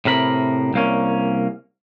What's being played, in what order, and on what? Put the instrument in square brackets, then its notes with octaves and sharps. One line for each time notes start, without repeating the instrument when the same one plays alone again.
[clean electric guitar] A2 C3 A#4 B5
C2 A#3 C#4